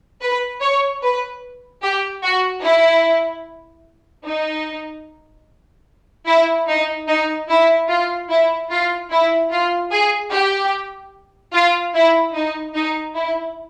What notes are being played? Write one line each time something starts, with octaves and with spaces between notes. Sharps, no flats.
B4
C#5
B4
G4
F#4
E4
D#4
E4
D#4
D#4
E4
F4
E4
F4
E4
F4
G#4
G4
F4
E4
D#4
D#4
E4